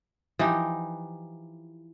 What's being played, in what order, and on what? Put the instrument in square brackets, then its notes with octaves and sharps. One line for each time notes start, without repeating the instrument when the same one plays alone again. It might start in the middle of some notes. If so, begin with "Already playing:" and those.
[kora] E3 F3 D#4 G4